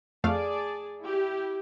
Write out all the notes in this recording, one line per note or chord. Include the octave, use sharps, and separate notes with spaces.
F2 A3 G#4 D5 F5 A5
E4 G4